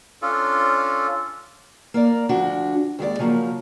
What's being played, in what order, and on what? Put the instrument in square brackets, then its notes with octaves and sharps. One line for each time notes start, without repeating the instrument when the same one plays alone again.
[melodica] C#4 D4 F4 A4
[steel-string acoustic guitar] A#3 A#4 D5
D2 F3 D4 F#4
D#2 G#3 F4 D5
C#3 F3 F#3 A#3